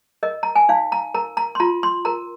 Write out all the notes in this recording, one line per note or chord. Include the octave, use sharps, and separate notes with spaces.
A#4 D#5
A#5
G#5
D#4 F5
A#5
A#4 A#5
A#5
C6
F4 A#5
C6
A#4 A#5